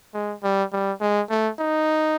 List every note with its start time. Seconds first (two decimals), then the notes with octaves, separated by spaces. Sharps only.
0.14 G#3
0.43 G3
0.72 G3
1.01 G#3
1.30 A3
1.59 D#4